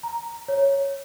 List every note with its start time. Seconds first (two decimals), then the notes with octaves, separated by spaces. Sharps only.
0.03 A#5
0.48 C#5